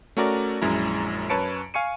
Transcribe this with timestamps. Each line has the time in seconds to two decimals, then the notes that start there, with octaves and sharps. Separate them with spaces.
0.17 A3 C#4 F#4 A#4 D5
0.62 A#1 F#2 G#3 E4 A#5
1.29 F#2 B4 C#5 A5 C#7 D7
1.74 F5 G#5 C#6 C#7 D#7